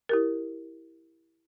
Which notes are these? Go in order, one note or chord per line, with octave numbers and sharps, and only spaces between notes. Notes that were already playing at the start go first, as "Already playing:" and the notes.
E4 G4 A#4